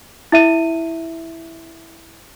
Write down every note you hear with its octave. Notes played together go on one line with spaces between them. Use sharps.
E4 E5 D#7